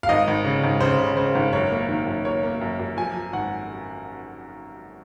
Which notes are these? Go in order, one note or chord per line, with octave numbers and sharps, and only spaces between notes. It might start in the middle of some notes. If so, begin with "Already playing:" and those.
F5
G#1 D#5
G#1
C#3
G#1
C#3 C5
C#3
C#3 C5
G#1
F#2 C#5
A#3
D#3
F#2
A#3 C#5
A#3
F#2
F#2
F3 G#5
F3
G#1 F#5